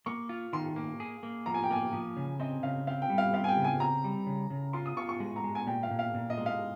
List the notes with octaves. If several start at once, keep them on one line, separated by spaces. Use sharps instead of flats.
A#3 C#6
F4
D#3 C6
A#3
G#4
A#3
F3 A#5
G#5
G5
A#3 G#5
F3
C#3
C4 D#5
C#3 F5
C4 F5
G5
G3
F5
C4 F5
G#5
G5
C#3
G#5
C4 A#5
G3
C#3
C#3
F4 C6
D#6
F4 C#6
C#6
G#3
A#5
G#3
G#5
A#2 G5
F5
A#2
F5
A#2
D#5
G#3
F5